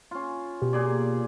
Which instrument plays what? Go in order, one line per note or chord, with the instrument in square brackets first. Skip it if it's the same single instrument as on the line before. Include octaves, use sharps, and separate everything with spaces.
[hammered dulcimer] C#4 F4
[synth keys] B2 G4
[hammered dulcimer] A#2 G#4 D5